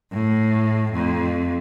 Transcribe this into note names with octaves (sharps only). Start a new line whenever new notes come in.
A2
F2